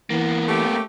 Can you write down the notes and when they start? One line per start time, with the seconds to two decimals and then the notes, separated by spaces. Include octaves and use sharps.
0.10 E3 A#3 B3
0.48 A3 C#4 G4